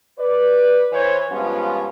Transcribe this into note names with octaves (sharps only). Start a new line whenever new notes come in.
B4 D5
E3 C5 C#5
G2 F3 G#3 B3 C#4 F4